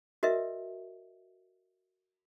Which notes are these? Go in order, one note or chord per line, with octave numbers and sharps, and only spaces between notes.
F#4 A#4 B4 D#5 E5